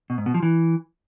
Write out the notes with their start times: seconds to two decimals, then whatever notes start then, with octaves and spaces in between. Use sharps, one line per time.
0.10 B2
0.18 G#2
0.26 B2
0.34 F3
0.43 E3